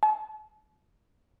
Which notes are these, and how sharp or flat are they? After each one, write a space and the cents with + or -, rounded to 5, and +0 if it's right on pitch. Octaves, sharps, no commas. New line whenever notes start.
A5 -40